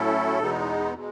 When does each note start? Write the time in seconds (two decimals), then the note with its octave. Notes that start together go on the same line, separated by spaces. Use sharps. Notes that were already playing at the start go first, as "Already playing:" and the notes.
Already playing: A2 F#3 A3 C#4 E4 A4
0.39 E2 B2 G#3 B3 D#4
0.94 B2 G#3